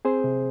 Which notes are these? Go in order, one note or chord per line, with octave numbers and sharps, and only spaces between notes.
C4 G#4 C5
C3